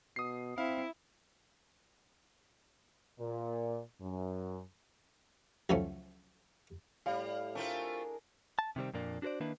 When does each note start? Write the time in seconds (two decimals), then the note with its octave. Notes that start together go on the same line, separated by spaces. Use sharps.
0.16 B2 D#6 C7
0.58 C4 E4 F5
3.19 A#2
4.01 F#2
5.70 C#2 F3 F#3 A3 C#4
7.06 A2 G3 F5
7.55 A3 C4 D4 F4 G#4 A#4
8.59 A5
8.76 C3 D#3 G3 C4
8.93 F2 A#2 A#3 D4
9.22 D4 F#4 A4 C5 D5
9.40 D#3 A#3 D4 E4 B4